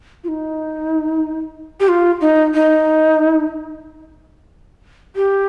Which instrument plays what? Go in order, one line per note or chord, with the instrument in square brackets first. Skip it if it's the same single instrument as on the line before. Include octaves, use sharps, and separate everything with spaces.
[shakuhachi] F4
D#4
G4
F4
D#4
D#4
G4